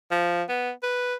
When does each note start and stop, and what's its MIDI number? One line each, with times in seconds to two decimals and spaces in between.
0.11 0.43 53
0.49 0.72 59
0.83 1.15 71